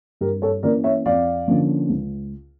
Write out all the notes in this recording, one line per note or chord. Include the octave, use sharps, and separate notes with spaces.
G2 G4 A#4
A4 C#5
E3 A#3 C#4 A#4 D5
C#5 E5
F2 D5 F5
D3 F3 A#3 C#4
C#2